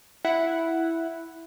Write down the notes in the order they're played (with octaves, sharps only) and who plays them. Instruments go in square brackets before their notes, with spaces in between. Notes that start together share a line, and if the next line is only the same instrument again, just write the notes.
[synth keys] E4 F#5